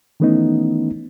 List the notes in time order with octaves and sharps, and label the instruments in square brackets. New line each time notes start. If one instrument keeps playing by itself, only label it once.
[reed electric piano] D#3 E3 A3 B3 C#4 D#4